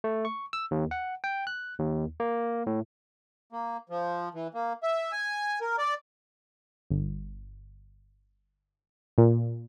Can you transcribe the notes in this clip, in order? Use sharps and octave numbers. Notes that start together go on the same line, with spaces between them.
A3
C#6
E6
D#2
F#5
G5
F#6
D#2
A#3
A2
A#3
F3
E3
A#3
E5
G#5
A#4
D5
G1
A#2